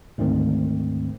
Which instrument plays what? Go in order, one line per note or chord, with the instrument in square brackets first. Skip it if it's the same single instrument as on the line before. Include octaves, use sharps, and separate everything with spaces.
[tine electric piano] D2 G#2 D#3 C4